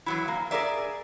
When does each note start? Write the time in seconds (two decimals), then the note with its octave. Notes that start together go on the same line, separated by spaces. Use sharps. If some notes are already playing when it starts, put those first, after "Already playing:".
0.06 E3 F#3 E4
0.28 A#3
0.51 G#4 A#4 D5 E5